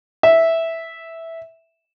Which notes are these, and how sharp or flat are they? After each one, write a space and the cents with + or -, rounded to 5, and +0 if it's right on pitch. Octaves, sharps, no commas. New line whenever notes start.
E5 -5